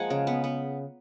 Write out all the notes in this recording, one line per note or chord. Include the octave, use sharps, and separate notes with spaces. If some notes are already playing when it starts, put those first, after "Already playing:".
Already playing: F3 G#3 A#3 F#5 G#5
C#3
B3
B3